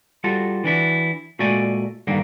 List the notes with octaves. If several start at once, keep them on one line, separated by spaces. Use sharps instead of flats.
G3 F4 F#4 A4
E3 D4 E4 F#4
A#2 G#3 A3 F#4 D5 G#5
G2 D3 D#3 A#3